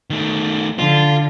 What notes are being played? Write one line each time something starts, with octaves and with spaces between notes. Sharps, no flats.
D#3 A3
D3 F4